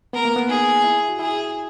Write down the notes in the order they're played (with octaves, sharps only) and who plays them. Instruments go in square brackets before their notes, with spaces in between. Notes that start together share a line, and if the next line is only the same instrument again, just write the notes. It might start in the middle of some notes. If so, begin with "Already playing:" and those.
[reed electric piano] B3 [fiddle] A#4
[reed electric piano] A#3
B3
[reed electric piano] D#4 [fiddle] G#4
[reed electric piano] E4
F#4
[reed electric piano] E4 [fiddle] G#4